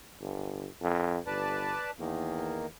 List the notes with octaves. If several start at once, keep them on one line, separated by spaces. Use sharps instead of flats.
G1
F2
G1 B4 D5 A5
E2 D#3 A#3